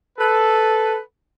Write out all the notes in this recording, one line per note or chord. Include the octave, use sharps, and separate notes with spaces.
A4 B4